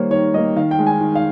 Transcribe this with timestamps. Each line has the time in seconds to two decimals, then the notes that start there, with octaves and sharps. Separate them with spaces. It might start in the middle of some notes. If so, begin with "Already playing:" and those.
Already playing: D#3 G3 A#3 A#4 C5 C#5
0.11 D#3 C#5
0.34 G3 A#3 D#5
0.56 D#3 F5
0.71 G5
0.79 G#3
0.87 G#5
1.01 D#3
1.15 F5